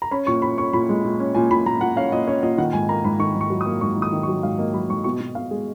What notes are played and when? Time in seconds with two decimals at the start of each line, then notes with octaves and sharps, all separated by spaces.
0.02 A#5
0.11 C#4 B5
0.27 A#2 C#6
0.42 C#4 B5
0.58 C#4 C#6
0.73 A#2 B5
0.89 G#3
1.04 A#2
1.20 C#4
1.35 A#2 G#5
1.51 A#2 B5
1.66 A#2 A#5
1.81 A#2 F#5
1.96 C#4 F5
2.12 A#2 D#5
2.27 C#4 C#5
2.43 A#2 D#5
2.58 D#3 F#5
2.73 G#2 G#5
2.89 A#3 A#5
3.04 G#2 B5
3.19 D#3 C#6
3.35 G#2
3.41 C#6
3.50 F#3
3.61 D#6
3.66 A#3
3.81 G#2 C#6
3.97 D#3
4.02 D#6
4.12 D#3
4.23 C#6
4.28 F#3
4.43 G#2 F5
4.58 A#3 D#5
4.74 F#3 B5
4.89 G#2 C#6
5.04 B2 C#6
5.20 B2
5.35 B2 F5
5.51 G#3 G#4